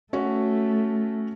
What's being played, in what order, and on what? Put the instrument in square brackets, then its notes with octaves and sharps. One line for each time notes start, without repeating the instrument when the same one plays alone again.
[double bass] A3 [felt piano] C#4 F#4